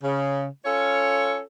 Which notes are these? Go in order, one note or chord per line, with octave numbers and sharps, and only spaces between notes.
C#3
C#4 F4 A4 C#5